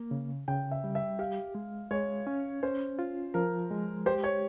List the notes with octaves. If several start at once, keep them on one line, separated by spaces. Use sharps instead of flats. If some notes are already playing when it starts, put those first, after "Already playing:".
Already playing: A#3
C#3
C#3 G5
E5
G3
E5
G4 F5
G#3
G#3 C#5
C#4
C#4 C5
F4
F3 A#4
G#3
G4 C5
C#5